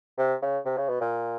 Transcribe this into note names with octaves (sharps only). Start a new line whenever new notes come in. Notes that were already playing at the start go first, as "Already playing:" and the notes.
C3
C#3
C3
C#3
B2
A#2